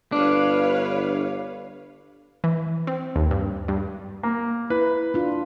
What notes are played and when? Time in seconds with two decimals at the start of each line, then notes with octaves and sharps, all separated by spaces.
0.12 G1 D4 B4 C#5 F5
2.44 E3
2.87 C4
3.16 D#2
3.31 G2
3.68 G2
4.23 A#3
4.70 E4 B4
5.14 D4 F4